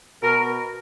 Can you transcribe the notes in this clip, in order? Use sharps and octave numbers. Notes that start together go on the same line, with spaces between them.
B2 A#4